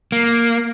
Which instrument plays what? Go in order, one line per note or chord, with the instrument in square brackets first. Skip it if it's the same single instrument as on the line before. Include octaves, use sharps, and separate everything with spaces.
[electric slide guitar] A#3